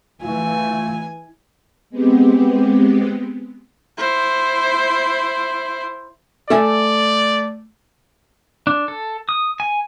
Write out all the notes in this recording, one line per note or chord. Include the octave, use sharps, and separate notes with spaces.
E3 A3 F4 G#5
G#3 B3 C4 G4
E4 C5
A3 A4 D5 E5 G#5
D4
A4
D#6
G#5